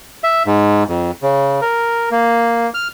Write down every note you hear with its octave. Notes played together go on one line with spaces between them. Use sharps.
E5
G#2
F2
C#3
A#4
A#3
F6